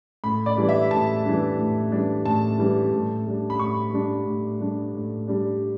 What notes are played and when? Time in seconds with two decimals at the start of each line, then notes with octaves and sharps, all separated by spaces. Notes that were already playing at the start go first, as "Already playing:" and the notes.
0.24 A2 B5
0.46 D5
0.57 E3 G3 D4
0.69 E5
0.91 A2 A5
1.24 E3 G3 D4
1.58 A2
1.92 E3 G3 D4
2.26 A2 A5
2.58 E3 G3 D4
2.93 A2
3.26 G3 D4
3.50 B5
3.59 A2 C#6
3.93 G3 D4
4.26 A2
4.60 G3 D4
4.94 A2
5.28 G3 D4